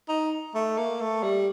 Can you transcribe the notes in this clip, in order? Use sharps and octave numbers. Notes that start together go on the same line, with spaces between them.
D#4
A3
A#3
A3
G3